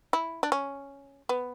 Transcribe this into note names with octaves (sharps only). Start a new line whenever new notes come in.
E4
D4
C#4
B3